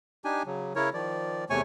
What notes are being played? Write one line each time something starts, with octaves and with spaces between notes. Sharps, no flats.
D4 D#4 G4 G#5
C#3 F#3
C#3 E4 A#4 C#5
D#3 F3 D5
E2 C3 A3 C#5 G#5 C#6